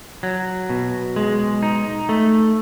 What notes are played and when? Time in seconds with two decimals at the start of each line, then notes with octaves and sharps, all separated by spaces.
0.23 F#3
0.70 B2
1.16 G#3
1.63 D#4
2.09 A3